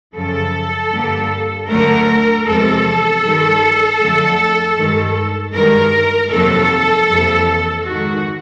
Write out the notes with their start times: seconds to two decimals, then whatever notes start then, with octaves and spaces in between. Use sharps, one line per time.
0.15 F#2 C#3 F3 A4
0.92 G2 D3 G3 A#3
1.68 D2 D3 F#3 A3 A#4
2.46 E2 C3 F3 G#3 A4
3.23 G2 D#3 G3
4.01 F2 D3 F#3 A3
4.77 G2 D#3 G#3
5.54 G2 D#3 G#3 A#4
6.31 F2 C3 D#3 F#3 A#3 A4
7.09 F2 C3 E3 G3 A#3
7.85 G#2 D#3 G#3 F#4